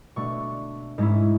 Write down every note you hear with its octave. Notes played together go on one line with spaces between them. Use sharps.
B2 A3 D4 C#6
G#2 G#3 C#4 E4